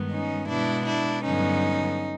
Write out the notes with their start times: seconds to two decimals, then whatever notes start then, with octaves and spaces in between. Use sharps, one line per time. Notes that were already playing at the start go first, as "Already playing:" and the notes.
Already playing: G2 D#3 G#3 B3
0.10 C#4 D#4
0.48 B2 G#3 B3 D4 E4
0.86 D4 E4
1.24 G2 D3 F#3 B3 C#4 D#4